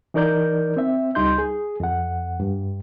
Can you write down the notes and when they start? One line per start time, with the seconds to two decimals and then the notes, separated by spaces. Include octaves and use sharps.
0.14 E3 D#4 A#4 D5 G6
0.77 C4 E5
1.15 C#2 G3 D#4 C6 G6
1.38 G#4
1.80 F2 F#5
2.40 G2